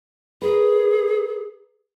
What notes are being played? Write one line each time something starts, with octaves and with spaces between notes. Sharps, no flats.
G#4 A#4 B4